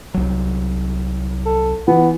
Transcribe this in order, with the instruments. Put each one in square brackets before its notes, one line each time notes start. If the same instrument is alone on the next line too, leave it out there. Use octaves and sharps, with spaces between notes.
[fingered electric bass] C2 F#3
[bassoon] A4
[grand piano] E3 [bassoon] B3